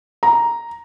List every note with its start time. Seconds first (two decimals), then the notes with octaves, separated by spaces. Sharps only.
0.23 A#5